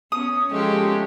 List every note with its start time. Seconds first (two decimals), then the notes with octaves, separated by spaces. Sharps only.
0.12 B3 C#4 D#6
0.51 F3 G#3 A3 C#4 G4